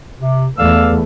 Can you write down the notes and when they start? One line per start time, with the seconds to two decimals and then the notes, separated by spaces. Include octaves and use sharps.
0.20 C3
0.58 E2 A3 B3 D5 F5 E6